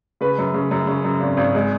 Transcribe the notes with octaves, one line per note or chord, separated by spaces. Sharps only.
C#3 B4
F#2
C#3
F#2
C#3
F#2
G#1
G#1
G#3